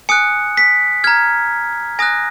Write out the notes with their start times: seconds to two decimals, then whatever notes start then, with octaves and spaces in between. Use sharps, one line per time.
0.09 G#5 D#6 F#6 C#7
0.57 B6
1.04 A#5 F6 G#6
1.99 G#5 D#6 F#6 A#6